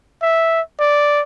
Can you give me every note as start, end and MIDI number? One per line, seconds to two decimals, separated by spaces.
0.22 0.61 76
0.80 1.21 74